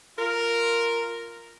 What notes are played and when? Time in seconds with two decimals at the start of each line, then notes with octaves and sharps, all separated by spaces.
0.18 F4 A#4